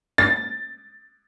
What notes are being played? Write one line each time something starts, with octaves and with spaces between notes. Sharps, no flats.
A6